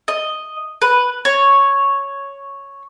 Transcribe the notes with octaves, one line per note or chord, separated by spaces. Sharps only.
D#5
B4
C#5